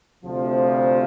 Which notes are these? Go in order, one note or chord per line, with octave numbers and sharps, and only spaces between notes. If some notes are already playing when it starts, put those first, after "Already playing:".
D2 C3 F3